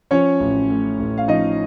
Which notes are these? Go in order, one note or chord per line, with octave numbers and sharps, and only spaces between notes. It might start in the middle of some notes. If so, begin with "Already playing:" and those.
F3 C#4 C#5
A1
A2
A1
F5
F3 D#4 D#5